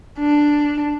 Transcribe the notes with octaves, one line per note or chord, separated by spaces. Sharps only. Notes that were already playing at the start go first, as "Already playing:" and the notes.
D4